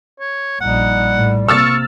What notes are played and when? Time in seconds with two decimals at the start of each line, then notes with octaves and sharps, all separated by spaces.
0.20 C#5
0.61 A#1 G3 D#4 F#5
1.17 A2
1.48 C3 A#3 C#6 E6 F6 A6